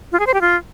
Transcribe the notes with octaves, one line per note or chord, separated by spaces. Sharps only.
F4
G#4
C5
G4
F4